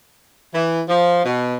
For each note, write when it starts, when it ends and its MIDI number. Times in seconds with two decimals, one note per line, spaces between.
0.55 0.81 52
0.89 1.25 53
1.25 1.57 47